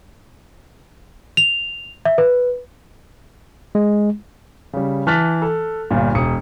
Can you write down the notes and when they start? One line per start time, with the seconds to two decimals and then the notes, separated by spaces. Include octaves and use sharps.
1.37 F7
2.05 E5
2.18 B4
3.75 G#3
4.73 C#3 G3
5.07 E3 A5 F6 F#6 A6 B6
5.42 A4
5.91 G1 G2 A#2
6.15 E1 D#6 C#7